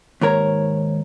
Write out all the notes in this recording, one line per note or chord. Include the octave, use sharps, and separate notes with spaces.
D#2 G#2 A#4 C#5